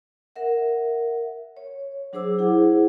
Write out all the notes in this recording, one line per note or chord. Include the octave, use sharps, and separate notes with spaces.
A#4 E5 F#5
C#5
F#3 D4 G#4 C5 D6 E6
E4 G#4 C5 F#5